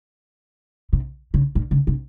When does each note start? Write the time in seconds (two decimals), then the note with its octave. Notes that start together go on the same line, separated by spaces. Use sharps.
0.93 C3
1.34 C#3
1.55 A#2
1.71 C#3
1.87 C3